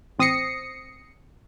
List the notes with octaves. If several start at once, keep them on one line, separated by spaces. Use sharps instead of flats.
A1 C4 D#6 A#6 C7 C#7